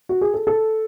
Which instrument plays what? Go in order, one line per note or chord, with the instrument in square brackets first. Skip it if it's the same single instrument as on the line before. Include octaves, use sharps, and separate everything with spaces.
[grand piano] F#4
G#4
A4
A4